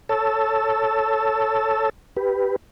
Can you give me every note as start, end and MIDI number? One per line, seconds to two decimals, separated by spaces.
0.09 1.90 69
0.09 1.90 73
0.09 1.90 81
0.09 1.90 88
2.16 2.56 67
2.16 2.56 71